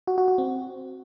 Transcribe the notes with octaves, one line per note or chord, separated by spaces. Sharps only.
F#4
F#4
F#4
C4